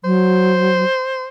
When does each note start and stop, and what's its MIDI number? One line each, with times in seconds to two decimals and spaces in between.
0.04 0.84 54
0.04 1.28 72